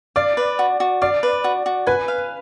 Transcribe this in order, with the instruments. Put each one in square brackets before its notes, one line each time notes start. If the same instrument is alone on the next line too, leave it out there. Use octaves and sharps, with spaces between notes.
[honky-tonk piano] D5 [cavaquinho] F5
[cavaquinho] B4
F#4
F#4
[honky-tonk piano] D5 [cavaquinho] F5
[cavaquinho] B4
F#4
F#4
[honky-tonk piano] B4 [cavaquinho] G#5
[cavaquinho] F5